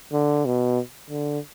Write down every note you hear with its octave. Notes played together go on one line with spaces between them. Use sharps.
D3
B2
D3